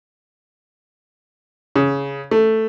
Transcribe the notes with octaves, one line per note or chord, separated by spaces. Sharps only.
C#3
A3